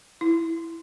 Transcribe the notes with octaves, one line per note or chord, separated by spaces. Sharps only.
E4